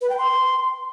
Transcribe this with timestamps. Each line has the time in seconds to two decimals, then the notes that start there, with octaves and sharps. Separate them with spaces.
0.01 B4
0.10 G5
0.18 C6